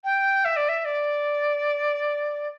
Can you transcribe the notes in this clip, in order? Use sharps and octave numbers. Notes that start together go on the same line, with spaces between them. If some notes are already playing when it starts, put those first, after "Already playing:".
G5
E5
D5
E5
D5